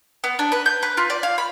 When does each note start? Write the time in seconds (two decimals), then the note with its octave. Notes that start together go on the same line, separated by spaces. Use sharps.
0.24 B3
0.39 D4
0.52 B4
0.66 G6
0.83 B4
0.97 F4
1.10 D5
1.23 F5
1.38 B5